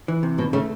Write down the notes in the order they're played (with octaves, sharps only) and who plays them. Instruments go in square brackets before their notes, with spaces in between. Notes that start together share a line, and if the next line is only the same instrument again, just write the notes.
[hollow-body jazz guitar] E3
C3
[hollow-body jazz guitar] D#2 [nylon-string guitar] B2
[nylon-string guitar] C#3 [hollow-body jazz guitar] A3